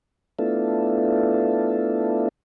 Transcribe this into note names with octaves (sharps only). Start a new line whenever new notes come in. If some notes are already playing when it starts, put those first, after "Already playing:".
A3 B3 D4 E4 F4 A4